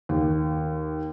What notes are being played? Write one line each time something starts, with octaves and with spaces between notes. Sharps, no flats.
D#2